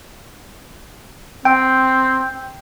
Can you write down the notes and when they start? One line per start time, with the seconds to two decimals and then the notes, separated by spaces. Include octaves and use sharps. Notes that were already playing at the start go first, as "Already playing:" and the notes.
1.45 C4 G5